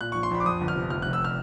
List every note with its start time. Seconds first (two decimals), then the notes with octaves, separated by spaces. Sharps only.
0.01 A#2 F#6
0.12 C#6
0.15 A#1
0.23 C6
0.31 A#1 B5
0.40 D6
0.46 F2 D#6
0.61 G1
0.68 F6
0.75 C3
0.90 F1 F6
1.02 F#6
1.06 F1
1.13 E6
1.25 F6